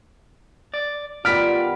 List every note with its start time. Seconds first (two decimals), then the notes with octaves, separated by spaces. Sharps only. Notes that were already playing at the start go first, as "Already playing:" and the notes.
0.74 D5
1.25 D#3 G3 B3 F4 D5 F6 B6